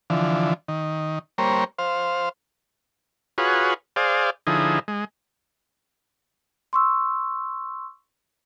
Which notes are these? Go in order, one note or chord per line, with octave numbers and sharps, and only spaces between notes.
D3 E3 F3
D#3
G3 A#3 A#4 C5 C#5
C5 F5
F4 F#4 G#4 B4 C#5
G#4 C5 D5 F5
D3 F3 D#4 E4 G#4
G#3
C6 C#6 E6